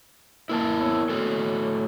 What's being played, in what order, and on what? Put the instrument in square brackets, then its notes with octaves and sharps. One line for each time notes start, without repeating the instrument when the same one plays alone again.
[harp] E3 A#3 [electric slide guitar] E4 A#4 A5
[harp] B3 C#5 E6
[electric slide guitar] A2 F#4 A4